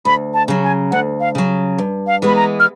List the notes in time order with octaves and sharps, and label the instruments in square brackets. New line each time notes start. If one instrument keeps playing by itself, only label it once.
[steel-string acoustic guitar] D2 [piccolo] B5
[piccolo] A5
[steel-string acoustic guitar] C#3 F#3
[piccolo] G#5
[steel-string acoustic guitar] D2 [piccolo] F#5
[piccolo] F5
[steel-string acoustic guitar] C#3 F#3
G2
[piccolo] F5
[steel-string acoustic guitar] E3 G#3 B3 [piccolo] B5
[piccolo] A#5
F6